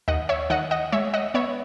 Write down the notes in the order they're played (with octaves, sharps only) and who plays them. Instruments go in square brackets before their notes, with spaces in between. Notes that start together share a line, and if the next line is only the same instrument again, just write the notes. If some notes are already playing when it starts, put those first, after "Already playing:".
[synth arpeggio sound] D#2 D#5 F#5
C#5 E5
D#3 D#5 F#5
D#5 F#5
G#3 C#5 E5
D#5 F#5
B3 C#5 E5